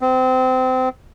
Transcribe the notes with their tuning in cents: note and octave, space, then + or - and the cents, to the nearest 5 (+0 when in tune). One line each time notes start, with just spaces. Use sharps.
C4 -25